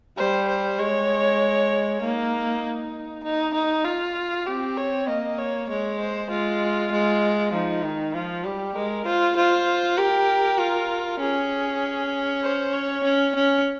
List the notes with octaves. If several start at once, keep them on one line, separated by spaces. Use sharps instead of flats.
G3 C5
C5
G#3 C#5
A#3 D#4
D#4
D#4
F4
C4 G4
C#5
A#3 D#5
C#5
G#3 C#5
C5
G#3 F4
G#3
F3 D#4
D#3
F3 F4
G3 G4
G#3 A#4
F4 C5
F4 C5
G4 A#4
F4
C#4 G#4
C5
C#5
C#4
C#4